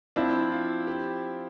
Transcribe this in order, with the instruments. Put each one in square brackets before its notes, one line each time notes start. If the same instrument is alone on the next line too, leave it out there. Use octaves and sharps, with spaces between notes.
[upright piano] F3 C4 E4 [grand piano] D4
[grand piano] F4
G4